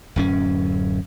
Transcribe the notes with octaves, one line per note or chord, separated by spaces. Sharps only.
D1 F#2 C#4